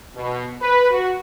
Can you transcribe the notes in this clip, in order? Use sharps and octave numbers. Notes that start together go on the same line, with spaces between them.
B2
B4
F#4